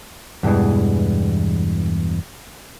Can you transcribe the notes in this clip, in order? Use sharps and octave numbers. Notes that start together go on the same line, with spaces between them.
E2 G2 B2 E3 G#3